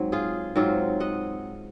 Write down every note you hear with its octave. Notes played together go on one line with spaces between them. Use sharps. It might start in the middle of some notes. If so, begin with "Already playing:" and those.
Already playing: G#2 F#3 C4
F4 G#4
G#2 F#3 C4 F4
D#5 F#5